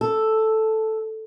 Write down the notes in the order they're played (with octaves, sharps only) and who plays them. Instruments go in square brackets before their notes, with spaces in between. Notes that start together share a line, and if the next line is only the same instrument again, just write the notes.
[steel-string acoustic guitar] A4